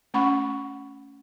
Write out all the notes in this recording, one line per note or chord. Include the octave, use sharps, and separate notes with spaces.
A3 C#4 F#5 B5 C#6